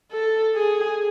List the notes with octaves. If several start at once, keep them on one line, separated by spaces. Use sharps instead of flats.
A4
G#4